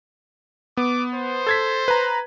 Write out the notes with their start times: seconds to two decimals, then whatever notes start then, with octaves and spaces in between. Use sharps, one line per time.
0.77 B3 D6
1.15 C5
1.47 A4 G#6 B6
1.88 B4 A#5